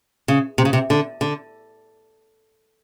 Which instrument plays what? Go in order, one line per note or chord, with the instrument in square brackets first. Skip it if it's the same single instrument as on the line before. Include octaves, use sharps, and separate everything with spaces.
[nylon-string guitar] C#3
C3
C#3
C3
D3
D3